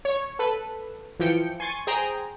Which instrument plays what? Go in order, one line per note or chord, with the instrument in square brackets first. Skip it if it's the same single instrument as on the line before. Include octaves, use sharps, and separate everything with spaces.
[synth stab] C#5
A4 B4
E3 F3 G5 C#7
G#5 C6 C#6 G#6 A6
G#4 C5 G5 A#5